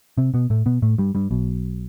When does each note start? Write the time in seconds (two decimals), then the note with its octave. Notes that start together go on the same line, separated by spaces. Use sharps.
0.18 C3 C4
0.34 B2 B3
0.50 A2 A3
0.66 B2 B3
0.82 A2 A3
0.98 G2 G3
1.15 G2 G3
1.31 B1 B2